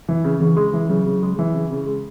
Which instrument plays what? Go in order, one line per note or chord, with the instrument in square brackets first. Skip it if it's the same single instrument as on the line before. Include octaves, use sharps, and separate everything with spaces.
[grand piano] E3
C#3
[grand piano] C#3 [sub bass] E3
[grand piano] G#3
E3
[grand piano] C#3 [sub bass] F#3
[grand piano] C#3
G#3
E3
C#3
C#3
G#3